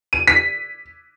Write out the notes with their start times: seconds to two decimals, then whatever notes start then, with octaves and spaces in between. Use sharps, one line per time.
0.13 D#7
0.27 B6